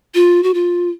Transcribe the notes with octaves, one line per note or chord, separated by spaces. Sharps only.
F4
F#4
F4